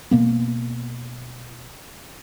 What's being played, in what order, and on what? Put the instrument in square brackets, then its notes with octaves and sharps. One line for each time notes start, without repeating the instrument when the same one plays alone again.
[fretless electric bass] B2 A#3 B3